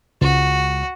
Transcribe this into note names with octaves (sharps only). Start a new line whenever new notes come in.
C#2 F#4